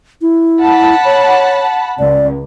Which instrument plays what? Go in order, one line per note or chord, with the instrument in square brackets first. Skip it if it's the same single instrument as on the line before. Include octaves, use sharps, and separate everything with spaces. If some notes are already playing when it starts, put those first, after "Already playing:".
[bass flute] E4
[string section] F#5 A5 B5
[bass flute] C#5
[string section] C#2 [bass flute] D5